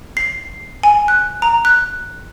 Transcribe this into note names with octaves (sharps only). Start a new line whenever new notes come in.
C7
G#5
F#6
A#5
F#6